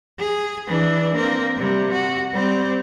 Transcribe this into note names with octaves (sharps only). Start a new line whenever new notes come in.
G#4
E3 D4
A#3 C4
C3 G3
F#4
G3 C4